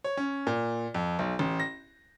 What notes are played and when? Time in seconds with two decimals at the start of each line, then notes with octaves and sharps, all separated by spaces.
0.04 C#5
0.17 C#4
0.47 A#2
0.94 F2
1.19 B1
1.39 A1
1.60 A#6